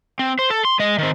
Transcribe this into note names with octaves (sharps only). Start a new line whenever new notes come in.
C4
C5
A4
C6
G#3 D#5
D#3 C4